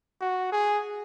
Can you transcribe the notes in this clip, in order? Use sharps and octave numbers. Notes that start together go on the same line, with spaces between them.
F#4
G#4